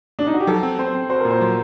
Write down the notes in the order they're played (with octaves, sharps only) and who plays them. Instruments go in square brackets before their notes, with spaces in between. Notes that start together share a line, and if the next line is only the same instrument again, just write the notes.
[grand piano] D4
D#4
F#4
G4
[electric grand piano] F#3 [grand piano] A4
[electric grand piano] C4
[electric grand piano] C4 [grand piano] C5
[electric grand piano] C4
[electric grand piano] F#4 [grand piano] C5
[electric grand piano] A#2 [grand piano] A#4
[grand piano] C5
[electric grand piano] F#3